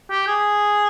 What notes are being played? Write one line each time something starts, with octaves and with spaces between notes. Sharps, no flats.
G4
G#4